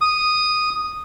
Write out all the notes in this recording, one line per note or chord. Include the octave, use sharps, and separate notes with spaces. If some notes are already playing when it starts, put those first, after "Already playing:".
D#6